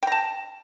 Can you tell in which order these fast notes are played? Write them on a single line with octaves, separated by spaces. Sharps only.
G5 A#5 A5